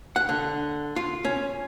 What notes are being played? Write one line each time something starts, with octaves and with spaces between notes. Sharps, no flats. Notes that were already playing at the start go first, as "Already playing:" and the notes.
F#5
D3
F4
C#4